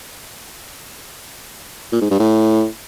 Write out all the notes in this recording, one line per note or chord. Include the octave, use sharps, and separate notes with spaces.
A#2
G#2
G2
A2